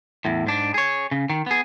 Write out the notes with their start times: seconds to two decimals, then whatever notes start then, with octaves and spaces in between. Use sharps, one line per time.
0.25 E2 A2
0.47 G#2 D4
0.74 G#4 C#5
1.11 C#3
1.30 D#3
1.46 B3 G#4